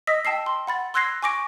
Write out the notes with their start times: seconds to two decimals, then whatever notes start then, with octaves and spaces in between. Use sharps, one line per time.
0.07 D#5 D#6 E6 A#6 B6
0.25 G5 A5 E6 C7
0.46 C6
0.67 F#5 B5 A6
0.94 C6 E6 F#6 G#6 A#6 C7
1.23 G#5 C#6 D6 A#6 D7